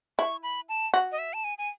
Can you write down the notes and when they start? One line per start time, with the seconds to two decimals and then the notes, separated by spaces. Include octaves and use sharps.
0.19 E4 C#6
0.43 B5
0.69 A5
0.94 F#4
1.12 D#5
1.18 E5
1.33 A5
1.44 G#5
1.58 G#5